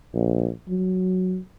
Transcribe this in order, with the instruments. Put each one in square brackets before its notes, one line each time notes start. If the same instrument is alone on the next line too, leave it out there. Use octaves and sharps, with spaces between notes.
[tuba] A#1
F#3